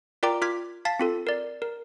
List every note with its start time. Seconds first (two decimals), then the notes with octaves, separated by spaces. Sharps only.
0.23 F4 A#4 D5 G5 A#5 D6
0.42 F4 D6 F6 G#6 B6
0.85 F5 A5 A6 B6
0.99 C4 F4 A4
1.27 A#4 D5
1.62 A#4